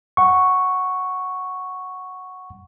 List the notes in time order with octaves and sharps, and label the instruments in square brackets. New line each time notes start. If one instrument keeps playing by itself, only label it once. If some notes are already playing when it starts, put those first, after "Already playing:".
[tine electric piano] F#5 C#6